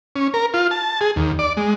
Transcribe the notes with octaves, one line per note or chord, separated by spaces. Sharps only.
C#4
A#4
F4
A5
G#4
D#2
D5
G#3